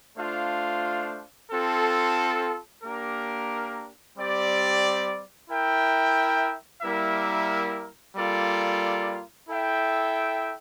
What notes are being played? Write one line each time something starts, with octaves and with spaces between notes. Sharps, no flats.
A3 D4 F4 C5 F5
C4 F4 A4
A#3 D4 G4 A#4
G3 C4 G4 D5
E4 A#4 E5 G5
G3 A#3 E4 A#4 E5
G3 A#3 F4 A4 D5
E4 A4 E5 G5